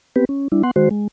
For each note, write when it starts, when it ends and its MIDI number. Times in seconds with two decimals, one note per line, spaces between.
0.16 0.25 59
0.16 0.25 60
0.16 0.25 67
0.16 0.25 71
0.29 0.48 61
0.52 0.63 55
0.52 0.63 62
0.52 0.63 64
0.63 0.71 59
0.63 0.71 78
0.63 0.71 84
0.76 0.89 51
0.76 0.89 56
0.76 0.89 66
0.76 0.89 72
0.91 1.08 56